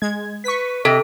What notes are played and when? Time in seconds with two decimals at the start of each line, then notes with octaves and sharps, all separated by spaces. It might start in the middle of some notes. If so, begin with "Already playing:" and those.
0.02 G#3 G#6
0.44 B4 C#6 B6
0.85 C3 A4 D#5